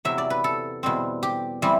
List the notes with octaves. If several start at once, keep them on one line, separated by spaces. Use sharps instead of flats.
E2 C3 F#3 E5
D5
B4
A4
E2 B2 G3 C4
G4
E3 G3 C4